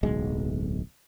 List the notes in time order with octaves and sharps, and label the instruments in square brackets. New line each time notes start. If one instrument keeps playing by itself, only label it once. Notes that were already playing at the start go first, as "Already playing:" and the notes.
[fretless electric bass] D1 B1 G#3